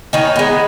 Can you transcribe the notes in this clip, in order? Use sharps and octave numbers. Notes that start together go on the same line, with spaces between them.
D#3 C#4 D#4
G#3 B3